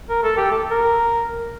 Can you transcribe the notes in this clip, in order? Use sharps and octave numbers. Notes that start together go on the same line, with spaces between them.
A#4
A4
G4
A4
A#4